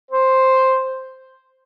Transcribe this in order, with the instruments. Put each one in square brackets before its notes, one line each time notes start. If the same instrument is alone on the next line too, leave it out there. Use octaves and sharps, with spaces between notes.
[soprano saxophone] C5